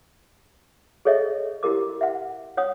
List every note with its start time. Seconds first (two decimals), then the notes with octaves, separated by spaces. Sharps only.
1.05 G#4 A4 C#5 D#5 E5
1.63 E4 G4 A#4 D6
2.01 E5 F#5
2.57 C#5 F#5 D#6